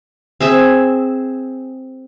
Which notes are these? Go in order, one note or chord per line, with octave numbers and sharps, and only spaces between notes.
C4 G#4 E5